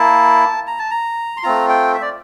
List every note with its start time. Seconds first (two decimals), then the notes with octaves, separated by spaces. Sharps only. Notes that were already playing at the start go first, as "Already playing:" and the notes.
Already playing: A#3 E4 A5
0.67 A#5
0.79 A5
0.91 A#5
1.37 C6
1.43 A3 C4 F4 A#5
1.69 G5
1.94 E5
2.02 D5